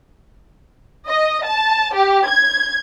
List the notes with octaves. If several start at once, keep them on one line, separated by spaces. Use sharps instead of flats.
D#5
A5
G4
G#6